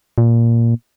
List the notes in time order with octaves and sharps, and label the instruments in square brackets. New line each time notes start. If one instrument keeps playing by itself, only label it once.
[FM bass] A#2